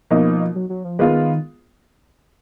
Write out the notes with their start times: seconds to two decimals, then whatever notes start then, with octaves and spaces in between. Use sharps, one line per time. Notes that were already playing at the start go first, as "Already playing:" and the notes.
0.10 B2 F3 A#3 D#4
0.55 F#3
0.69 F#3
0.84 F3
0.99 D#3 G#3 B3 F4